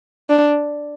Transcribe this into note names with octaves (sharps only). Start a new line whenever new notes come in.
D4